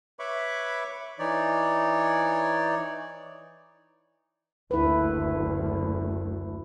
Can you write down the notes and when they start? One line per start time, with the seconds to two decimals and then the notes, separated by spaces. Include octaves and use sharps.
0.19 B4 C#5 E5 B5 C#6 D6
1.19 E3 D#4 C#5 D5
4.71 F#1 D2 E4 B4